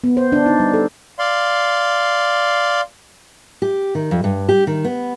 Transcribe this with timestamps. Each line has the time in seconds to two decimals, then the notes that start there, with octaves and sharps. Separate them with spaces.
0.04 B3
0.17 C5
0.32 D4
0.46 D#4
0.60 G3
0.73 A4
1.19 D5 F5 C6
3.62 G4
3.95 D#3
4.11 F2
4.24 G2
4.49 G4
4.67 D#3
4.84 B3